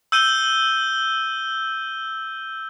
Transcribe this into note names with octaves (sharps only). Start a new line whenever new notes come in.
E6 G6 D#7 G7